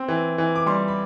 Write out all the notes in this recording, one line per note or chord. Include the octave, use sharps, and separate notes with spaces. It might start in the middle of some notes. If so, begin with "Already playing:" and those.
Already playing: C4
E3
E3
D6
G3 C6
B5